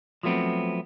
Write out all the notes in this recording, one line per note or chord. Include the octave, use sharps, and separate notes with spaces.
F3 F#3 A3 B3 C4